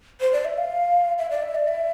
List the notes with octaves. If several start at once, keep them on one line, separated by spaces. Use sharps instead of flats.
C5
D5
E5
F5
E5
D5
E5
D5
E5